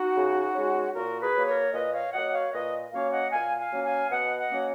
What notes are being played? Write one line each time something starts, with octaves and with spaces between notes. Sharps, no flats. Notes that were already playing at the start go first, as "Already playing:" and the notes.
Already playing: D#4 F#4
C#3
G#3 C#4
A#2 F#4 A#4
G#4 B4
F#3 A#3
A#4 C#5
A#2 B4 D#5
C#5 F5
F#3 A#3 D#5 F#5
C#5 F5
A#2 B4 D#5
F#3 A#3 C#4 C#5 F5
D#5 F#5
A#2 F5 G#5
F5 G#5
F#3 A#3 C#4
F5 G#5
B2 D#5 F#5
D#5 F#5
F#3 A#3 C#4